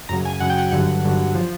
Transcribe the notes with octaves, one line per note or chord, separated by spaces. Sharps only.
F#2 C#3 F#3 A#5
G#5
F#2 C#3 F#3 F#5
G5
F#5
G2 D3 F#3 F#5
G2 D3 F#3
F3